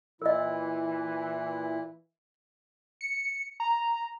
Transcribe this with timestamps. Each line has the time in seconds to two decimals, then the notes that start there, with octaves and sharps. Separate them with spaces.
0.22 A#2 E3 E4 A#4 D#5
3.01 C#7
3.60 A#5